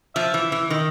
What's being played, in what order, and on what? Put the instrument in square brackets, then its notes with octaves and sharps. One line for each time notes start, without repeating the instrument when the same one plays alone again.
[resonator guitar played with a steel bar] F3 [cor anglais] E5
[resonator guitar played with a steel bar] E3
E3
D#3